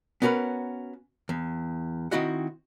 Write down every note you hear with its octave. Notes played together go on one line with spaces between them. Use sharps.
B3 C#4 F#4 A#4 B4
E2
D#3 C4 E4 F#4 D#5 F#5